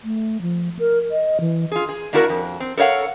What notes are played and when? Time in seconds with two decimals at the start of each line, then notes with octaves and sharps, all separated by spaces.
0.04 A3
0.41 F3
0.79 A#4
1.11 D#5
1.40 E3
1.72 F4 G#4
1.89 G#4
2.13 A#3 D4 E4 F#4 A4 A#4
2.29 F2
2.60 C4
2.77 A4 A#4 C#5 F5 F#5